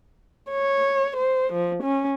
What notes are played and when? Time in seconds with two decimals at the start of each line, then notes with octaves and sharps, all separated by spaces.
0.51 C#5
1.17 C5
1.53 F3
1.83 C#4